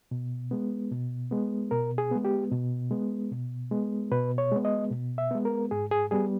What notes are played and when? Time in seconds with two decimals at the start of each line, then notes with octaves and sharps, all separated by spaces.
0.11 B2
0.51 G#3 B3
0.91 B2
1.31 G#3 B3
1.71 B2 A#4
1.98 G#4
2.11 G#3 B3
2.25 G4
2.51 B2
2.91 G#3 B3
3.31 B2
3.71 G#3 B3
4.12 B2 B4
4.38 C#5
4.52 G#3 B3
4.65 D#5
4.91 B2
5.18 E5
5.31 G#3 B3
5.45 A#4
5.71 G#2 G#4
5.91 G#4
6.11 G3 B3 G#4